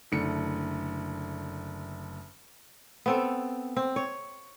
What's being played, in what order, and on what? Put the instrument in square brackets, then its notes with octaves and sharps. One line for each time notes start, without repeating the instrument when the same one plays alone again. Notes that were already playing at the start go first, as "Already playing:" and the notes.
[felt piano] F#1 D3 A3 C#7
[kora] B3 C4 A4
C4
C#5